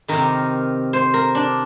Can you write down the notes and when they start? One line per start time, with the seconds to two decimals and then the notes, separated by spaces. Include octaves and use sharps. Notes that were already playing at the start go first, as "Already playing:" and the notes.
0.08 C3 D#3 A#4
0.93 C5
1.14 A#4
1.35 D4